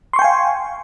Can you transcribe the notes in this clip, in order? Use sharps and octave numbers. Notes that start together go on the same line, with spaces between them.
F5 G5 G#5 C6 C#6